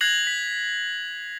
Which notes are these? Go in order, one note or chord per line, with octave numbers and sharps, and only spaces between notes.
F#6 G#6 A#6 C7 F7 F#7
B6